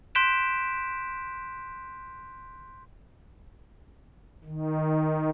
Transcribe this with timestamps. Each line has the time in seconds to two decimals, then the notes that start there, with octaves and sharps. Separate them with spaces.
0.15 C6 F#6 G6 B6 D7 E7
4.44 D#3